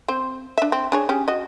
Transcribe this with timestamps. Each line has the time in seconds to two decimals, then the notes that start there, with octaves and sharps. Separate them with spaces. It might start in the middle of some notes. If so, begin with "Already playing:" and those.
0.08 C4 C5
0.58 D4 E5
0.72 C4
0.92 D4 G#4 C#5
1.09 C#4 G4 G#4
1.28 F#4 D#5